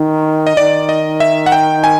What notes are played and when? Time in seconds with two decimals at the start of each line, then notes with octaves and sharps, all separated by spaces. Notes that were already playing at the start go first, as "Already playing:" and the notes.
Already playing: D#3
0.47 D#5
0.57 D#3 D5
0.89 D#5
1.20 E5
1.46 F#5
1.52 G5
1.84 G#5